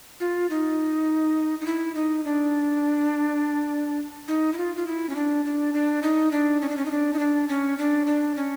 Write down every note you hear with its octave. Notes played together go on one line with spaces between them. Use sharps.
F4
D#4
D#4
E4
D#4
D4
D#4
E4
F4
F4
E4
C#4
D4
D4
D4
D#4
D4
C#4
D4
C#4
D#4
D4
D#4
D4
C#4
D4
D4
C#4